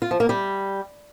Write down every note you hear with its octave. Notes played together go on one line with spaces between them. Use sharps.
F4
F3
A#3
G3